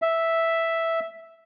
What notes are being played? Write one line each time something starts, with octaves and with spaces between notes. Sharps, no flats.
E5